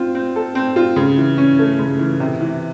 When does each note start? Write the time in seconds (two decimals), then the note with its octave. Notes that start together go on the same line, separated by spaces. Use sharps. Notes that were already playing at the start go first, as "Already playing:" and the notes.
Already playing: C4 F4
0.15 C4
0.36 A4
0.55 C4
0.76 F4
0.96 C#3
1.17 E3
1.38 C#4
1.59 A3
1.79 C#3
1.99 E3
2.20 C3
2.41 E3